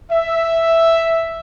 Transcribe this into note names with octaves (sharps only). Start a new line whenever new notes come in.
E5